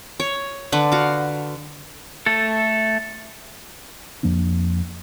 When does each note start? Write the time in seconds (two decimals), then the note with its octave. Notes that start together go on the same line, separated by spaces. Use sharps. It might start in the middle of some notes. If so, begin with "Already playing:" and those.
0.20 C#5
0.72 D3 B4
0.92 F#4 F5
2.26 A3 A4
4.23 F2 F3 A#3 D4